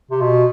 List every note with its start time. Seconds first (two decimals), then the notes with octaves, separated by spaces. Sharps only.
0.11 C3
0.21 B2